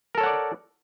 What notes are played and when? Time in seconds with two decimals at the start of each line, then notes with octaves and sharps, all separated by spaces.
0.15 A#4
0.18 A4
0.20 C#5
0.23 F#5
0.26 D5